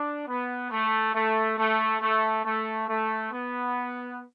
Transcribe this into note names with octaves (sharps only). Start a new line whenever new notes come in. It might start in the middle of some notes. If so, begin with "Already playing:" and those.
Already playing: D4
B3
A3
A3
A3
A3
A3
A3
B3